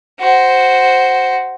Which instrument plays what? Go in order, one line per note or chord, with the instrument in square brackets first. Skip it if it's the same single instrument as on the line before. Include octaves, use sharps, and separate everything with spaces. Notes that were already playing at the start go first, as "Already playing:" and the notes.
[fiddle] F#4 C5